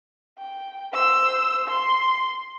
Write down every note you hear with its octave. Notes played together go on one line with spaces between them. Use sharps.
G5
C5 E6
C6